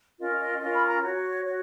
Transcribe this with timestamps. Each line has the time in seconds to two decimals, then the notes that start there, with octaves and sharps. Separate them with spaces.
0.19 C#4 F4 A#4 D#5
0.40 D#5
0.61 C#4 F4 A#4 D#5
0.75 B5
0.89 A#5
1.02 F#4 C#5
1.45 F#4 C#5